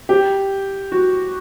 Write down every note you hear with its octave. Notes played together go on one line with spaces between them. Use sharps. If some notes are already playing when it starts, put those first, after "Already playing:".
G4
F#4